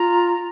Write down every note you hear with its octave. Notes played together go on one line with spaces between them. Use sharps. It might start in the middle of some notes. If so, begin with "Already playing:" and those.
Already playing: F4 A#5